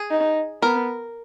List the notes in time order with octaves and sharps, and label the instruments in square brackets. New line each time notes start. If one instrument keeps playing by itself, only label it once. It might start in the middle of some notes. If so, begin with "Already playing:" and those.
Already playing: [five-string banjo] G#4
[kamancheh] D#4
[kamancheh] B3 [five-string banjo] A#4